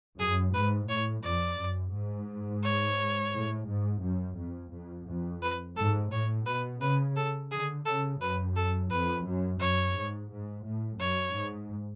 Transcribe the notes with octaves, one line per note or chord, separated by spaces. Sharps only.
F#2 G#4
G#2 B4
A2 C#5
F2 D5
F#2
G#2
C#5
A2
G#2
F#2
F2
F2
F2
B4
G#2 A4
A2 C#5
B2 B4
C#3 B4
A4
D3 G#4
C#3 A4
F#2 B4
A4
F2 B4
F#2
F#2 C#5
G#2
G#2
A2
F#2 C#5
G#2